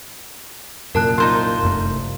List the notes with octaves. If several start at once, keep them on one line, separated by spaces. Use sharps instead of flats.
C2 F#2 A#2 A#4 A5 F#6
D#4 F4 C5 C6
F1 F#2 A3